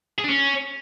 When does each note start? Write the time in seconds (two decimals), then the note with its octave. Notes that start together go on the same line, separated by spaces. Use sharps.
0.19 G#4
0.24 D4
0.30 C#4